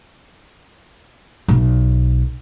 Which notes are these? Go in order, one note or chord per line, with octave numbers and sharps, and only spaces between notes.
B1